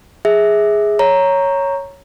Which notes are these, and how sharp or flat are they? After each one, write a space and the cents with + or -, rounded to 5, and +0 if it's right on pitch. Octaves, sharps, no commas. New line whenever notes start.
G#4 +0 E5 -20
C#5 +0 A#5 +0 C#6 +0